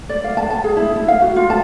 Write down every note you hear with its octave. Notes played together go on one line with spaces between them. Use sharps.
D5
F5
A5
A5
G#4
E4
E4
F5
F#4
F4
A5